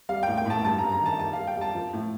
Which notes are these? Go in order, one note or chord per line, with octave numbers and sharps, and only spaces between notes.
G3 F5
G5
A2
G5
A2 A5
G2 A5
A#5
G2
A#5
D#3 A5
G3 A5
F5
G3
G5
G3 A5
F3
A2